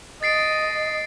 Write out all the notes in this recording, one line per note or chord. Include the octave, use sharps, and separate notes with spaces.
D#5 A6 C7 D7